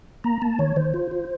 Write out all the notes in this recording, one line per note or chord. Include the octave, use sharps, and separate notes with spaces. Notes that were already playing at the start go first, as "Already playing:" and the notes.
A#3 A#5
A#3 A5
D#3 C#5
D#3 C5
F4
F4